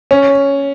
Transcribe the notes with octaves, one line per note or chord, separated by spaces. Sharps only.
C#4